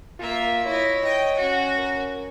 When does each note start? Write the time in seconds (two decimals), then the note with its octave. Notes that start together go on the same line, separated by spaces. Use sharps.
0.19 A#3 F4 E5
0.66 E4 C#5 D#5
1.04 D#5 G5
1.38 C#4 F#4
1.78 A#4